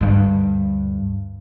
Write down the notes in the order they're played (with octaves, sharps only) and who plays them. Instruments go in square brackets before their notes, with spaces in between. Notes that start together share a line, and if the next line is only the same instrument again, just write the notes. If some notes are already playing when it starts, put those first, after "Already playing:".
[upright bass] D2 G2